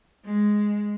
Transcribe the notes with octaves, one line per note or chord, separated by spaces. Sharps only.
G#3